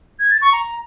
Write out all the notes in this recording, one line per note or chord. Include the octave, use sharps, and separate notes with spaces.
G#6
A6
C#6
A#5